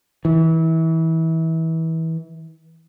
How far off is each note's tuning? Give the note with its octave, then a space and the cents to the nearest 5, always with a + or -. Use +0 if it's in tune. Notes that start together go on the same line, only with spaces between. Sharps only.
E3 -25